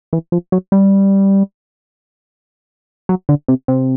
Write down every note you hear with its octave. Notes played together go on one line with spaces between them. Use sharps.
E3
F3
F#3
G3
F#3
D3
C3
C3